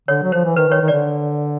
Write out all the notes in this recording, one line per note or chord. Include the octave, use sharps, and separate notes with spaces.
D3 C#5
F#3
F3 C5
E3
D#3 B4
D#3 C#5
D#3
D3 D5